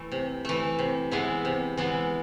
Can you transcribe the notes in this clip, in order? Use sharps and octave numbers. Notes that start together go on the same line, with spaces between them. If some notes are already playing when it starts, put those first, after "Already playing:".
Already playing: E3 A3
C3
E3 A3
C3
E3 G#3 B3 E4
C3
E3 G#3 B3 E4